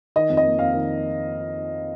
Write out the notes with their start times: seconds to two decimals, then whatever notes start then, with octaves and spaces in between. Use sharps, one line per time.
0.16 D#3 D#5
0.30 F2
0.37 D#5
0.45 A#3
0.59 F2 F5
0.74 D#3